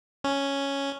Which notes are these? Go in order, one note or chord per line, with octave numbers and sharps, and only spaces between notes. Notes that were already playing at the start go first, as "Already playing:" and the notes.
C#4